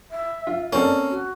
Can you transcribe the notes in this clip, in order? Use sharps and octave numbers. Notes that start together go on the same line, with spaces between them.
E5
F4
A#3 C4 C#4 A4 D5
F#4